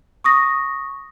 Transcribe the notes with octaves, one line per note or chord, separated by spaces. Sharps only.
C#6 D#6 A#6